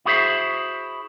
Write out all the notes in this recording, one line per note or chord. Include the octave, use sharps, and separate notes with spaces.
E4 F#4 G#4 C5 E5